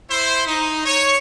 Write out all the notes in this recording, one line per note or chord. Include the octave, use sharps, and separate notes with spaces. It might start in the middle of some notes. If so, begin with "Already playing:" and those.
E4 C5
D#4
C#5